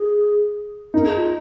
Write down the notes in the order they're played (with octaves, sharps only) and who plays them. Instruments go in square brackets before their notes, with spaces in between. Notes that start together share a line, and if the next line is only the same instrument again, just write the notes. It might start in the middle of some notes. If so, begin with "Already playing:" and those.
Already playing: [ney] G#4
[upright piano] D#4 [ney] A#4
[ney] G#4
F4